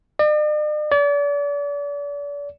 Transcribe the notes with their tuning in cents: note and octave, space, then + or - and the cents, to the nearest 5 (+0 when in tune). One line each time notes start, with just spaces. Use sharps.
D5 +45
D5 -40